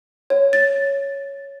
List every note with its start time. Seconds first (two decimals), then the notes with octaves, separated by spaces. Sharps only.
0.30 C#5
0.53 A6